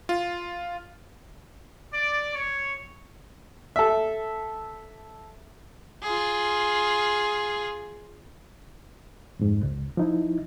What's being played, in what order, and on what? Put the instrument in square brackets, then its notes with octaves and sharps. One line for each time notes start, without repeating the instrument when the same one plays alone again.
[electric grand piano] F4
[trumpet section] D5
C#5
[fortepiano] A4 E5
[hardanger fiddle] F4 G#4
[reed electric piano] F2 G#2
C#2
F3 D#4 E4